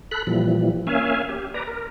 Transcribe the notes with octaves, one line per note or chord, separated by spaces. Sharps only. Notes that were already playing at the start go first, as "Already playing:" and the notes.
A4 B5 F#6
A#2 E3 F3 G3
A#3 C#4 E5 F5 G#5
G4
B4 D5 A#5
A#4